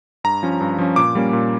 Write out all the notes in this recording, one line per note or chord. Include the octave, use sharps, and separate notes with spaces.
G2 A#5
F3 C#4
G2
F3 C#4
A#2 D6
G3 A#3 C#4
A#2